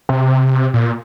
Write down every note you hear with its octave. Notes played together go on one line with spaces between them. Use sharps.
C3
A#2